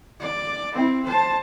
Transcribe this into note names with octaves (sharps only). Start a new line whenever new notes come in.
D5
C4 E4
C5 A5